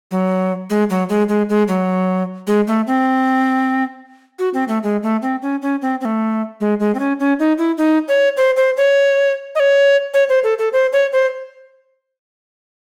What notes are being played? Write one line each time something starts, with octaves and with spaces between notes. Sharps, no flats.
F#3
G#3
F#3
G#3
G#3
G#3
F#3
G#3
A3
C4
F#4
C4
A3
G#3
A3
C4
C#4
C#4
C4
C4
A3
G#3
G#3
C4
C#4
C#4
D#4
E4
D#4
C#5
C5
C5
C#5
D#5
C#5
C#5
C5
A4
A4
C5
C#5
C5